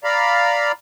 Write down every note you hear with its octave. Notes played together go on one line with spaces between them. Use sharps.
D5 F5 A#5 B5